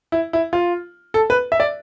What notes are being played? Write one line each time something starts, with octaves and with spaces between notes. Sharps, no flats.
E4
E4
F4
A4
B4
E5
D5